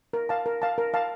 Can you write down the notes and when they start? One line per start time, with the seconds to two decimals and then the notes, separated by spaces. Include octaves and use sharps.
0.13 A#4
0.29 F5 A5
0.46 A#4
0.62 F5 A5
0.78 A#4
0.94 F5 A5